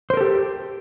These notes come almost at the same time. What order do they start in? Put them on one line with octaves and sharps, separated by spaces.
C5 A#4 A4 G4